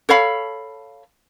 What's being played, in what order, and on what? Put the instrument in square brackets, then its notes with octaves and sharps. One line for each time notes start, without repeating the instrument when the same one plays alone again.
[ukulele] A4 C#5 F5 B5